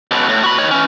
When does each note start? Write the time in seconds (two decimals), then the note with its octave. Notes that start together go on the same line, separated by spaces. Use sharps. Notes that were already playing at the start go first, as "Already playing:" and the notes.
0.11 C#2 B2
0.29 A2
0.43 F#4 B5
0.58 D#3 C#5
0.71 E3 C#4